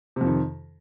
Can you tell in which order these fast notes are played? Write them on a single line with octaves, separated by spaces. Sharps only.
C3 F2 D#3